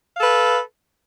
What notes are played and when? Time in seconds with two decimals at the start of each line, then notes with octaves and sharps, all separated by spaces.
0.17 F5
0.20 A4
0.23 B4